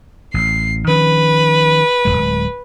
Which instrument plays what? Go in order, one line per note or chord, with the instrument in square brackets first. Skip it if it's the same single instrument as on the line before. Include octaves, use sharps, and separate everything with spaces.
[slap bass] A1 [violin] C7
[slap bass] D#3 F3 C#4 [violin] B4
[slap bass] D1 D#2 G#3